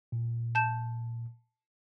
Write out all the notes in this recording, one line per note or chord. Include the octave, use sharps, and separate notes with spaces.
A#2
A5 G6 E7